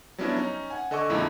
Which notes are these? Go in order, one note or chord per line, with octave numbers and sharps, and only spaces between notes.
F#3 G3 B3 C#4 D4 E4
C#4 D#4
F#5 G#5
D3 A4 D#5 G#5 C#6 D6
F2 A#2 D3 G#3 D#4 E4